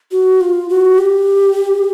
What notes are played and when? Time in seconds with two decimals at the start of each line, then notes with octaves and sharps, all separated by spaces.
0.11 F#4
0.41 F4
0.70 F#4
0.98 G4